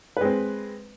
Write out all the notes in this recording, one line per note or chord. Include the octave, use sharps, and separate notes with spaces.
G#3 C4 B4